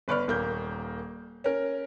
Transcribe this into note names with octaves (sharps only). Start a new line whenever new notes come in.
G1 B4 D5 C#6 F6
D#1 A#3 G6
C#4 A#4